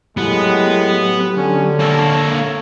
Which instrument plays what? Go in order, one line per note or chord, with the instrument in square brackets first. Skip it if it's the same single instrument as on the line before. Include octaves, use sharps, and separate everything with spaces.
[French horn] A2 [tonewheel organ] F#3 G4 [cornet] G#3 [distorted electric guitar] B3
[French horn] D3 [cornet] C#4
[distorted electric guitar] A#3 A4 [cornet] C#5